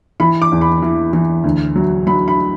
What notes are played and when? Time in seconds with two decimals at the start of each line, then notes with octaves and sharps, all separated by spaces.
0.20 E3 B5
0.42 D6
0.52 E2
0.61 B5
0.82 E3
1.13 E3
1.44 D2
1.75 F#3
2.07 F#3 B5
2.28 B5